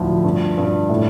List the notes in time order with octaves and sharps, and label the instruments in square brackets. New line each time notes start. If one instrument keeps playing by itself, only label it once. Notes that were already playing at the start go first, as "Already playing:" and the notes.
Already playing: [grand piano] D2 A2 F3
G2
G2
A2